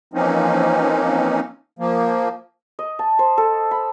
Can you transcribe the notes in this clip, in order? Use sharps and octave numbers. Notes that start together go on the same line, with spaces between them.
E3 F3 A#3 C4 C#4 D#4
F3 A#3
D#5
A5
C5
A4
B5